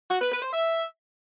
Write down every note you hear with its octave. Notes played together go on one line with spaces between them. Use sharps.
F#4
B4
B4
C5
E5